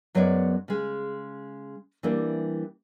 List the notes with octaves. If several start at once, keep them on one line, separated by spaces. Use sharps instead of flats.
F#2 F#3 G#3 B3 C#5 D5
C#3 G#3
E3 G3 A#3 D4